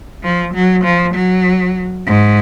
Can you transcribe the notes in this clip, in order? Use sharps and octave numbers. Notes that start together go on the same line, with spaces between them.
F3
F#3
F3
F#3
G#2